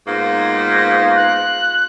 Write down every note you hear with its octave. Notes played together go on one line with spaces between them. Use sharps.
G#2 A#3 B3 F4
F#6